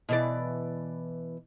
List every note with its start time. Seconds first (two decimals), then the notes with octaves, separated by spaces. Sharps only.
0.09 B2 E3 D5